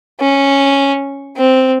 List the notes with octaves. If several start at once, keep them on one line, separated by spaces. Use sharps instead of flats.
C#4
C4